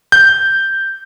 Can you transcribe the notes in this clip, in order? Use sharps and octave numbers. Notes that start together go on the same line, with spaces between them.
G6